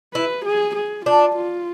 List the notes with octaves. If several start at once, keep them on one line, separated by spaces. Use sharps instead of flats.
E4 B4
G#4
G#4
D4 F4
F4